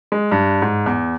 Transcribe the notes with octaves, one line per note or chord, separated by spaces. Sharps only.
G#3
G2
G#2
E2